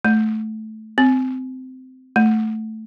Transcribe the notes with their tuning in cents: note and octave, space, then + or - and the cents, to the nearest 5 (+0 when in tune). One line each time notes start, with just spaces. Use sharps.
A3 -10
C4 -20
A3 +0